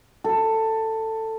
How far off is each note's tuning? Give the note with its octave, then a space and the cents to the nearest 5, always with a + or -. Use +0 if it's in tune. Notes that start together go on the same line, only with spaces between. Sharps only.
A4 +15